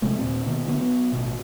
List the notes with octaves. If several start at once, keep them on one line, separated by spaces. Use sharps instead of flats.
C3 F3 G#3 A3
D#2 A#2 C4
B2 D#3 A#3
D3 F#3 A#3 B3
F#3 B3
A1 B2